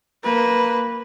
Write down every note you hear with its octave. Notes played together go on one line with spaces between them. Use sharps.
A#3 B4